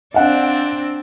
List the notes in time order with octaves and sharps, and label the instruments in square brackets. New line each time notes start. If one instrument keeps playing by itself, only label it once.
[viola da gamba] C4 D4 [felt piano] F5 F#5